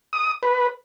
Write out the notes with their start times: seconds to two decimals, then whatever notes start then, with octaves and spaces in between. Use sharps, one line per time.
0.13 D#6
0.43 B4